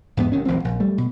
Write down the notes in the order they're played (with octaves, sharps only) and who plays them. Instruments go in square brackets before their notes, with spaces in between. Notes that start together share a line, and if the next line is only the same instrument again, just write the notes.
[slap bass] E2 G#2 G3 B3
F1 C3 D#3 C#4
D#1 A1 F3 C4
A#1
G3 A3
B2